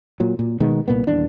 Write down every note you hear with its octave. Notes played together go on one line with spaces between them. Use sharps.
A#2 F#3
A#2
B2 D#3 G#3 B3
C2 A#2 A#3 B3
D#1 E2 D4